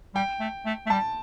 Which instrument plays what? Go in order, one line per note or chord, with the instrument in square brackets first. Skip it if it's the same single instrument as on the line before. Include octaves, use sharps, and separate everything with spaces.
[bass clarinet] G3 [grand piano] G5
[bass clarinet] A3
A3
A3
[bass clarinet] G3 [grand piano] A5